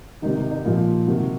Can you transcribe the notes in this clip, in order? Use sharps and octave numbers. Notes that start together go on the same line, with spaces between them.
C3 D#3 D#4
D#4
D#4
A#2 F3
C3 D#3 F#4